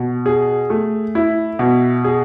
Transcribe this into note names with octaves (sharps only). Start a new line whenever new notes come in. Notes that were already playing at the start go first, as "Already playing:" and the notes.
Already playing: B2
G#4
A3
E4
B2
G#4